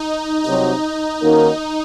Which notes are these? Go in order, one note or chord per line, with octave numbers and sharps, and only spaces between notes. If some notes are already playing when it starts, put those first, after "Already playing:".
Already playing: D#4
C2 C3 F#3 D#4
D#3 A#3 C#4 F#4 A#4